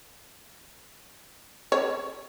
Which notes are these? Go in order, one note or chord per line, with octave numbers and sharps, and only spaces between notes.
C#5